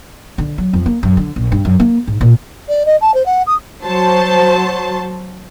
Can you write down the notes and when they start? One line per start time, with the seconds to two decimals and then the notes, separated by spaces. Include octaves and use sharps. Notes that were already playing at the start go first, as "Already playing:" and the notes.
0.38 D3
0.58 F#3
0.73 F2
0.86 A#3
1.03 F#2
1.17 D3
1.36 A#1
1.52 G2
1.65 F#2
1.80 A#3
2.08 G#2
2.21 A#2
2.68 D5
2.85 D#5
3.01 A5
3.14 C5
3.25 F#5
3.46 D#6
3.83 F#3 C5 A5